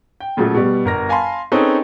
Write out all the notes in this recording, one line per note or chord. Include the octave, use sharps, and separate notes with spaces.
G5
A#2 C#3 F3 F#3 A3
B2 G3
G1 A#4 A#6
F5 G#5 A5 B5 C6
C4 C#4 D#4 G#4 A4 B4